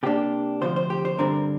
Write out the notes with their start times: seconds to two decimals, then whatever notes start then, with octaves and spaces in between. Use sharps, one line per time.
0.03 C3 A#3 D4 G4
0.61 D2 C3 F3 C5
0.76 C5
0.90 G4
1.05 C5
1.18 G2 D3 G3 C4 A#4